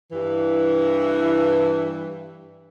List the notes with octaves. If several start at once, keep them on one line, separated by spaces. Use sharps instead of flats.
G2 E3